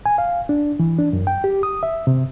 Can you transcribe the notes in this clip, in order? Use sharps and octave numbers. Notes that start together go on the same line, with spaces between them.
G#5
F5
D4
E3
D4
F#2
G5
G4
D#6
E5
C3